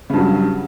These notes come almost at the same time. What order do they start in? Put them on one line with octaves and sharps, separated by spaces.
C#3 G2 F#3